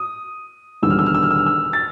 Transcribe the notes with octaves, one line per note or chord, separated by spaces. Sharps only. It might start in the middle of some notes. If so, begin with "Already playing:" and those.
Already playing: D#6
E1 D#2 D3 G3 B3 E6
F6
E6
F6
E6
F6
E6
F6
E6
A6